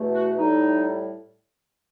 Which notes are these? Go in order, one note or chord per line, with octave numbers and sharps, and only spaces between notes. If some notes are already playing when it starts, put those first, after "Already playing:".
Already playing: E2 B2 A3
F#4
A2 G3 D#4